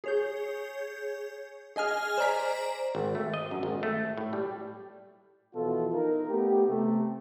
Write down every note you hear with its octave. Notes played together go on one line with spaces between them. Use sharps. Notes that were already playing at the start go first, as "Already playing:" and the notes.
G#4 C#5 G6
G#4 D#5 G#5 F6
C5 D5 A#5 B6
G#1
A3
D#5
F#2
G#1
A3
A2
G3
B2 E3 F3 F4 A4
D#4 A#4
A3 B3 G4
C3 A3